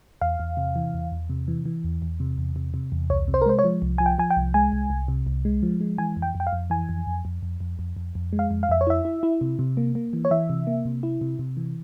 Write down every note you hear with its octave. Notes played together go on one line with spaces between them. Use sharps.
E2 F5
E2
C3
E3
E2
E2
C3
E3
E3
E2
E2
C3
E2
C3
C3
E2
C2 C#5
C3
C5
A#4
G#3 C5
C#5
F3
C2
F3 G#5
G5
F3 G#5
G5
C2
G#3 G#5
C2
C2
C3
C2
G#3
F3
G#3
E3 G#5
F2
G5
F2
G5
F5
F2
E3 G#5
F2
F2
F2
F2
F2
F2
F2
F2
G#3
F5
F2
F5
F2 E5
C#5
E4 E5
E4
E4
C3
C3
A#3
A#3
E3
C#5
E3 E5
C3
A#3
C3
E4
C3
C3
E3